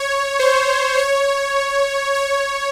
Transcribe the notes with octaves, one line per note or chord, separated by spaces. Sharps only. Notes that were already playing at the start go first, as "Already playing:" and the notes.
Already playing: C#5
C5
C#5
C#5